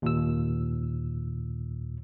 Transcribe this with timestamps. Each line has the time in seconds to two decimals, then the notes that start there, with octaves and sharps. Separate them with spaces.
0.02 D#2 A#2 E6